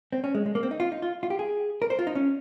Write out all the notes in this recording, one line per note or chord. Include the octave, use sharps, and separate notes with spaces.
C4
C#4
G#3
G#3
A#3
C4
D#4
F4
D#4
F4
F4
G4
G#4
A#4
C5
F4
D#4
C#4